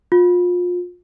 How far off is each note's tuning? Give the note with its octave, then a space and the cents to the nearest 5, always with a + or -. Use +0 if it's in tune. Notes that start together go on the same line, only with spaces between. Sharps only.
F4 +30